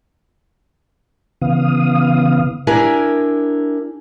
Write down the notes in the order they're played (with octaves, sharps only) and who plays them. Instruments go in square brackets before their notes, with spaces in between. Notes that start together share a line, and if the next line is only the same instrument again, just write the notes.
[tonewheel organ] C#3 E3 B3 F5 D#6
[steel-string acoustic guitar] D4 E4 G4 A#4 G#5